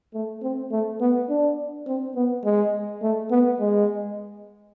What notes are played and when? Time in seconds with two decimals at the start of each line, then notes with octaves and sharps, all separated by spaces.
0.14 A3
0.43 C4
0.71 A3
1.01 B3
1.29 D4
1.87 C4
2.15 B3
2.44 G#3
3.02 A3
3.31 B3
3.60 G#3